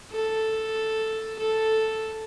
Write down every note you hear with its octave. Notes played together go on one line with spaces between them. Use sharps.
A4
A4